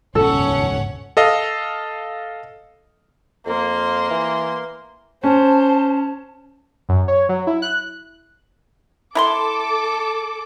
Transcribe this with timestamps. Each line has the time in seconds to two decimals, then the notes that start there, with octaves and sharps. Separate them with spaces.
0.15 D#1 G#2 C#3 C#4 A4 C#5 F#5
1.17 A4 D#5 F5
3.46 F2 A#3 C6
4.11 E3
5.24 C#4 C5 A5
6.89 F#2
7.08 C#5
7.29 F#3
7.47 E4
7.62 F#6
9.15 E4 A4 A#5 C6 D6